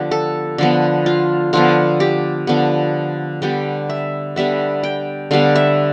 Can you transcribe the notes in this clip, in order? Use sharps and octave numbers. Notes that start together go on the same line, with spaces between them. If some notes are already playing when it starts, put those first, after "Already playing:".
Already playing: D3 F3 B3 G4
A4
D3 F3 B3
F4
D3 F3 B3 F4
G4
D3 F3 B3
D3 G3 B3 G5
E5
D3 G3 B3 E5
G5
D3 G3 B3 F5
E5